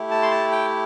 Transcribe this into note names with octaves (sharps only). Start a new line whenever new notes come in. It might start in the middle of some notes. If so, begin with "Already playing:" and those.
Already playing: A3 E4 G4
A5
C6
A5
G5